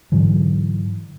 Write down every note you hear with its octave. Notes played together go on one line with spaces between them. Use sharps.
G#2 D3 E3 F#3